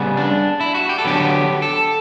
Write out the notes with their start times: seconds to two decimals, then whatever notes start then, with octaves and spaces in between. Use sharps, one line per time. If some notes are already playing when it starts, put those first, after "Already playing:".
Already playing: C#3 G3 B3
0.17 D4
0.61 E4
0.75 F#4
0.89 G4
0.98 A4
1.05 D3 F#3 B3 G4
1.62 A4